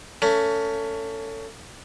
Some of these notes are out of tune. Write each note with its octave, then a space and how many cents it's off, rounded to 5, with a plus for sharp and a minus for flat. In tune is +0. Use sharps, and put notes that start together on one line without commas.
A3 +25 C#4 +25